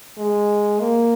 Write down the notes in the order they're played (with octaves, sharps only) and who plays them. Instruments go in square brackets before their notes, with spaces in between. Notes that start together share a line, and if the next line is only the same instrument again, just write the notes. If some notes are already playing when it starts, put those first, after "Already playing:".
[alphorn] G#3
A#3